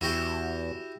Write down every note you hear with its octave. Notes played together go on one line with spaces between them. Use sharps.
E2 E4 F#4 G4